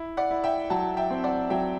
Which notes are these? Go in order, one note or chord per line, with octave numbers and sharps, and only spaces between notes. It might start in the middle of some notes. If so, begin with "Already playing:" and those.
Already playing: E4
D5 F#5
E4
E5 G5
F#3 F#5 A5
E5 G5
C4
D5 F#5
F#3 E5 G5